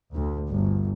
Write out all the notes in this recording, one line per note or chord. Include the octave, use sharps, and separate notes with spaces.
D2
G1